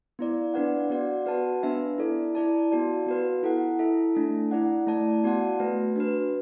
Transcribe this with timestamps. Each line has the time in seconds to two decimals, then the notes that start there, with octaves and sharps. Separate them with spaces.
0.19 B3 E4 D5
0.54 B3 D4 B4 D5 F#5
0.90 B3 F#4 D5 F#5
1.26 F#4 B4 F#5 A5
1.63 B3 D4 B4 E5
1.98 E4 A4 D5
2.35 E4 D5 A5
2.71 B3 F#4 D5 A5
3.07 B3 F#4 B4
3.43 E4 A4 F#5
3.79 E4 A4 E5
4.15 A3 D4 A4
4.51 E4 D5 F#5
4.87 A3 E4 D5 A5
5.24 B3 F#4 D5 F#5 A5
5.60 A3 F#4 B4
5.96 D4 F#4 B4